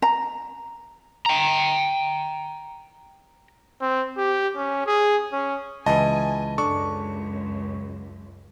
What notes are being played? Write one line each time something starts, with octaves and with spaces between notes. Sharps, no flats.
A#5
G5 A#5
C4
G4
C#4
G#4
C#4
C#2 E3 D#5 G#5 A5
C#2 F#2 D4 A4 C#6